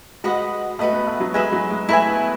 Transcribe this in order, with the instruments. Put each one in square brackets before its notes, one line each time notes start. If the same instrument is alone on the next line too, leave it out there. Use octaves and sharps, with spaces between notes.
[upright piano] G#3 [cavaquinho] F#4 B4 D#5 F#5
[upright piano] A3 [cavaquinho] F#4 B4 D#5 F#5
[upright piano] B3
A3
F#3
[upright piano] G#3 [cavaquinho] E4 B4 E5 G#5
[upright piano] F#3
G#3
[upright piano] A3 [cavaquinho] E4 B4 E5 G#5
[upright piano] B3